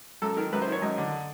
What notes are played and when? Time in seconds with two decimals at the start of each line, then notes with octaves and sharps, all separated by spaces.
0.22 F#2 A4
0.37 D#3 A#4
0.53 F#2 B4
0.62 C5
0.67 D#3 C#5
0.82 F#2 D#5
0.98 D3